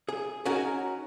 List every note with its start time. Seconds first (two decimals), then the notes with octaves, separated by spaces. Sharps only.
0.09 G#4
0.45 C#4 D#4 F#4 A#4 G#5